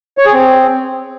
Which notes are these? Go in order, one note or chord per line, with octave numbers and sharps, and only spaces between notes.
C#5
G#4
C4